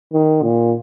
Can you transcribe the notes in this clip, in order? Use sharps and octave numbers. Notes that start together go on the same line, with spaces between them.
D#3
A#2